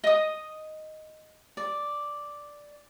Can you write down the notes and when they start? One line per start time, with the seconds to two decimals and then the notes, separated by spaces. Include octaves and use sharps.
0.04 D#5 D#6
1.57 D5